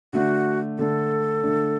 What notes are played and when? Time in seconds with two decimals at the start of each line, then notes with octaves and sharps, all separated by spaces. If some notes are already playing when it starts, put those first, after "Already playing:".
0.13 D3 A3 D4 F#4
0.78 D3 A3 D4 A4
1.43 D3 A3 D4